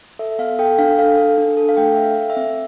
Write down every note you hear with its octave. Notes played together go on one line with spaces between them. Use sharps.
A4 E5
B3 F5
A4 G5
D4 F5
A4 F5
A4
D4
A4
F5
A3 G5
A4 E5
F5
A4
E5
C4